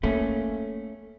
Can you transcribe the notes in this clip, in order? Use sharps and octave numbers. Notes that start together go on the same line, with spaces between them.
A3 A#3 C#4